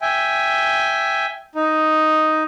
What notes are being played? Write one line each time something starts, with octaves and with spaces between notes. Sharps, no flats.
E5 G5 G#5
D#4